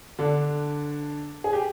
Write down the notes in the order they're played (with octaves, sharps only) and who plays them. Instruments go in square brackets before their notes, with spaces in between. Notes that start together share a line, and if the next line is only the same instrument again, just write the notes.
[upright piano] D3 D4
G#4
G4